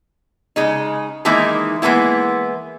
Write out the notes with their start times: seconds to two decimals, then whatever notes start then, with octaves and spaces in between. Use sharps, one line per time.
0.56 C#3 G#3 D#4
1.25 D#3 E3 G#3 A#3 D#4 E4
1.82 E3 G#3 A#3 B3 E4